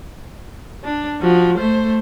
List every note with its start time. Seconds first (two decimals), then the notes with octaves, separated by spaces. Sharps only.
0.84 D4
1.21 F3 F#4
1.58 A3 C5